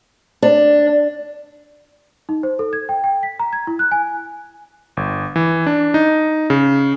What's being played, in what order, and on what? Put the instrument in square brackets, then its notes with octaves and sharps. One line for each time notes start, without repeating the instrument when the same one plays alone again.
[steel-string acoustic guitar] D4
[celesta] D#4
C5
A4
G#6
G5
G5
B6
A#5
G#6
E4
F#6
G#5
[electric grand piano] G1
E3
D4
D#4
C#3